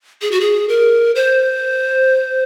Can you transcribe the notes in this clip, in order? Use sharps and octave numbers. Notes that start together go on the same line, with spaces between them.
G#4
F#4
G#4
A#4
C5